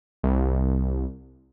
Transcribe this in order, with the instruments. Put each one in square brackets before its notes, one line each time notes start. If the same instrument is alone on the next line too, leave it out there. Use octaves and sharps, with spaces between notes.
[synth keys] C2